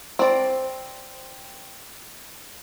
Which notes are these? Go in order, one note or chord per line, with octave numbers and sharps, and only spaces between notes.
C4 D5